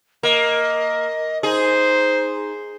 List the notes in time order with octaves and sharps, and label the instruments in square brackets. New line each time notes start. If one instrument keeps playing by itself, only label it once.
[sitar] A#3 [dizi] D#5
[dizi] D#4 [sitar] G#4 [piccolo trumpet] C5